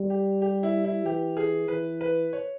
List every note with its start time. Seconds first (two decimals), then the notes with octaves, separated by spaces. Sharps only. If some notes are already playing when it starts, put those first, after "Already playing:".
Already playing: G3
0.10 G4
0.42 G4
0.63 E4
0.84 E4
1.05 E3 G4
1.37 G#4
1.68 E3 B4
2.01 B4
2.33 C#5